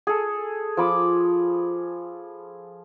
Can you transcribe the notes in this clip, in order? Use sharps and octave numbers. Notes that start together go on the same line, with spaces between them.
G#4 A4
F3 B5 D6